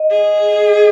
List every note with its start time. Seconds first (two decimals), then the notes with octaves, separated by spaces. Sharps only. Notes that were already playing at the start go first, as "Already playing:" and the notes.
Already playing: D#5
0.10 G#4